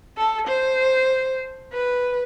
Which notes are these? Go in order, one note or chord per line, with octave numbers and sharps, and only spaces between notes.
A4
C5
B4